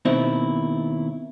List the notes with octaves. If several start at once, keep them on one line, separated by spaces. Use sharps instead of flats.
D#2 B2 C4 D#4 E4